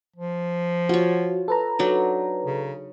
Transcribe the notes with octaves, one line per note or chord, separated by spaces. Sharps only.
F3
F4 F#4 C#5
A4 B4 A#5
F#3 D4 D#4
C#3